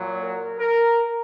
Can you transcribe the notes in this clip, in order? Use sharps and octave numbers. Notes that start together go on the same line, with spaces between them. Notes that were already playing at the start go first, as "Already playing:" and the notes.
Already playing: A#2 F#3
A#4
A#4